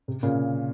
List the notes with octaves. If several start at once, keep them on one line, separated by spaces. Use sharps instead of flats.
C3
A#2 C#3